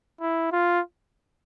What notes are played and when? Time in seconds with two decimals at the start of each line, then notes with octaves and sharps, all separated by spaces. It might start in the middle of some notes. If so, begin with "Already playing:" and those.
0.21 E4
0.52 F4